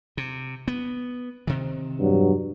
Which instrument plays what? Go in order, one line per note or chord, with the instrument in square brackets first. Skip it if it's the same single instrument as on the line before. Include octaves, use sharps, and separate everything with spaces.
[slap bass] C3
B3
C3 D#3
[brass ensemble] E2 G2 F#3